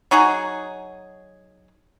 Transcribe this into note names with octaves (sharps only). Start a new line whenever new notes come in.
F#3 D#4 F#4 G#4